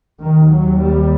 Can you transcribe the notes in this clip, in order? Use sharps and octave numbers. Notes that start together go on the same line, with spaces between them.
D#2 D#3
F#3
G3